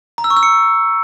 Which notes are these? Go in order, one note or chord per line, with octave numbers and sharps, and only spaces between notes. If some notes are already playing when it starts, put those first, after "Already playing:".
A#5
E6
C#6
E6
C#7